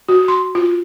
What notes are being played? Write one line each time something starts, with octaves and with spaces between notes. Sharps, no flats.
F#4
C6
F4